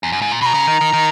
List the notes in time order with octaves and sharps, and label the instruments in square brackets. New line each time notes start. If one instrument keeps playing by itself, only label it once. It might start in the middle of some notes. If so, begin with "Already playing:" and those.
[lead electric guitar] E2
F#2
G#2
A#2
[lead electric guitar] B2 [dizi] B5
[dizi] A#5
[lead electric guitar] C#3
D#3
D#3
D#3